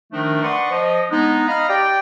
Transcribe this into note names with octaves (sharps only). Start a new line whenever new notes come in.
D#3 F3 A3 D4 D#4
B4 D5 F#5 C6 C#6 D#6
F3 D#5
G#3 B3 D4 D#4
D#5 F5 A#5 B5 F6
G4 D5 G5